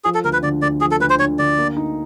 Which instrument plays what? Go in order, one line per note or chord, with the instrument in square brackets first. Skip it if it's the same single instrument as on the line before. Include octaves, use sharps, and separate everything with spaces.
[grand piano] F3 [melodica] G#4
[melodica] A4
[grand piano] D2 [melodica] A#4
[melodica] B4
[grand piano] D3 [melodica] D5
[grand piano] D2 [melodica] D5
[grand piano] F3 [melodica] G#4
[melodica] A4
[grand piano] D2 [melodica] B4
[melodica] C5
[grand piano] D3 [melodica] C#5
[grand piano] D2 [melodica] D5
[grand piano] A#3
D#4